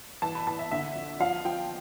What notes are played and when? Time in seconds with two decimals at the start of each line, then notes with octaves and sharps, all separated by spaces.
0.22 E3 A5
0.35 B5
0.47 E3 A5
0.59 E5
0.71 D3 E5
0.95 F2
1.20 F3 F5
1.45 F3 G5